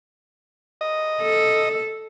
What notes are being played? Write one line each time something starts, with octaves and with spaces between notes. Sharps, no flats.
D#5
A4